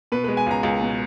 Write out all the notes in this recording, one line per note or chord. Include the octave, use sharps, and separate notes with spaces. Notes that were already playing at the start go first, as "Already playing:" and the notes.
B2 B4
G#3 B4
G#5
C#2 A#5
C#2
B2